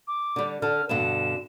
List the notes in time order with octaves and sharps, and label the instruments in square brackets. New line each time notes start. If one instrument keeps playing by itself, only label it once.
[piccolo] D6
[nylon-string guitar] D3 G3
[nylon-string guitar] D3 A4 [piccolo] F6
[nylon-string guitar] G2 B2 D3 [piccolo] E7